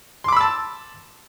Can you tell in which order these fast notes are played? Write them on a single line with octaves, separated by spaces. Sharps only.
C6 D6 B5 E6 A5